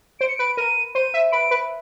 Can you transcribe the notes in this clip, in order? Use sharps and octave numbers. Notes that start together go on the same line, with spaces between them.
C5 D7
C#7
B4 D7
A#4 D#7
C5 D#7
E5
B4 D7
B4